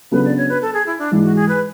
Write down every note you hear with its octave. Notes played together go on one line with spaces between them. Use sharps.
C#3 F#3 B3 D4 A4 B4
D5
C#5
B4
A4
G#4
E4
D4
G#2 E3 G#3
F#4
G#4
B4